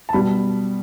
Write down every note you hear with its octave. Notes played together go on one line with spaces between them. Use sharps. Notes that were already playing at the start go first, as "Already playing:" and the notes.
A5
B2 G3 B5